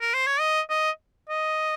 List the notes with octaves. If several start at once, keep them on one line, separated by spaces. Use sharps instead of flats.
A#4
C5
C#5
D#5
D#5
D#5